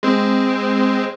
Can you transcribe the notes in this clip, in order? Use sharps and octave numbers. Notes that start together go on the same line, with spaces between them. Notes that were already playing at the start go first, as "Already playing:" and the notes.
G#3 C4